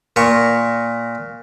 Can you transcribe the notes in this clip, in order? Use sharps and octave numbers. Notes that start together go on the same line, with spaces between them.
A#2 A#5 C#6